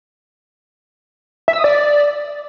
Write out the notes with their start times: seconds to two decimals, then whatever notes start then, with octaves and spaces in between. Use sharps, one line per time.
1.48 E5
1.53 E6
1.59 D#6
1.64 D5